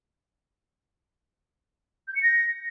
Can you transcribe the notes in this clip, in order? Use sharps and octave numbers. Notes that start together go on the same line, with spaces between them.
G6
C#7
A#6